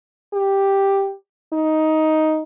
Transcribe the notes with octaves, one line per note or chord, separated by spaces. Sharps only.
G4
D#4